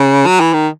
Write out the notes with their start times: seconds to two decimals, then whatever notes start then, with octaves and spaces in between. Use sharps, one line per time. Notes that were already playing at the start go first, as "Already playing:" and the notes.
Already playing: C#3
0.26 F#3
0.40 E3
0.53 D#3